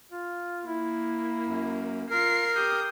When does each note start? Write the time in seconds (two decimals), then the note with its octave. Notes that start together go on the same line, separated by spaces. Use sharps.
0.11 F4
0.67 A#3 E4
1.47 F#2
2.11 F4 A#4 C7
2.56 G4 D#6 G6